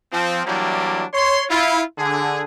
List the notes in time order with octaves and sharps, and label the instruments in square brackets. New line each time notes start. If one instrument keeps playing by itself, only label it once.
[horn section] F3 C4
E3 F#3 G3 A#3 D4 E4
C#5 C6
E4 F4
D3 G#4